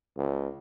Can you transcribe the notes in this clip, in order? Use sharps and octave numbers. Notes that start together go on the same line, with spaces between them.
C#2